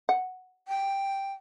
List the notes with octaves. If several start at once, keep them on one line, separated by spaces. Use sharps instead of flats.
F#5
G5